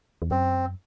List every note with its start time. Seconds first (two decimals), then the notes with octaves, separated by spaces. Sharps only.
0.22 E2
0.31 F#2 C4